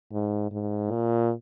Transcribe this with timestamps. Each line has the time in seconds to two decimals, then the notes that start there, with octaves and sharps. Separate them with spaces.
0.12 G#2
0.51 G#2
0.91 A#2